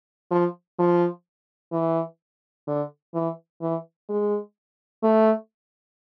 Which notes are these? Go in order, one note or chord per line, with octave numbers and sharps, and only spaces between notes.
F3
F3
E3
D3
E3
E3
G#3
A3